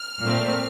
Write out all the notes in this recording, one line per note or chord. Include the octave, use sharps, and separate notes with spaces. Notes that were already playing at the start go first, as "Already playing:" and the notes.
Already playing: F6
A#2 F3 A3 C4